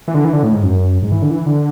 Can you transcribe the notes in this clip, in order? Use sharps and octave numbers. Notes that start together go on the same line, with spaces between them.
E3
D3
E3
D3
A2
G#2
F#2
G#2
E3
D3
E3
D3